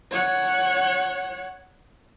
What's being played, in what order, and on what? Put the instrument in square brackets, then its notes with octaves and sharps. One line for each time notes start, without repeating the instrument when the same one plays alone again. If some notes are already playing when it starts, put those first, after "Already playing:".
[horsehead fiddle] C#5 F#5